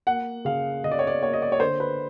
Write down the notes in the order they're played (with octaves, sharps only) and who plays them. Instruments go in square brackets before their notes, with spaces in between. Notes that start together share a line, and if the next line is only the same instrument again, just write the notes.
[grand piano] A#3 F#5
C#3 F5
C#3 D#5
D5
C#5
D5
A#3 C#5
D#5
D5
C#5
D3 C5
B4